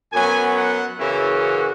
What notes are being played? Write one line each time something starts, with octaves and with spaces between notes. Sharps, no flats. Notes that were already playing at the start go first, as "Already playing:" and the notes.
F#2 F#3 B3 G#5
F#5
F#2 C#3 E3 C#4 E4
F#4